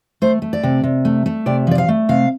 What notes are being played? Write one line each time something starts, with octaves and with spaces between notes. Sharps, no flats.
A3 C5
A3
D5
C3
C3
A3
A3
C3 D5
F3 D5
F5
A3
C3 F5